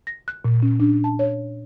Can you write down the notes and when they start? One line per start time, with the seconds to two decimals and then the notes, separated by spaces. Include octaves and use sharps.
0.07 A#6
0.28 F#6
0.45 A#2
0.62 C#4
0.80 D4
1.04 A5
1.19 C#5